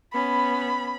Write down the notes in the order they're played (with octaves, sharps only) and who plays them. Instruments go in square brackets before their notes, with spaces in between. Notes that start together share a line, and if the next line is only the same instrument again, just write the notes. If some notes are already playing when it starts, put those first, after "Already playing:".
[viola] B3 C#4 [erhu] B5